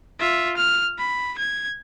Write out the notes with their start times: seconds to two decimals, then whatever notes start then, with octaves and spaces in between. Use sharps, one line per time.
0.20 F4 E5
0.57 F6
0.98 B5
1.38 G#6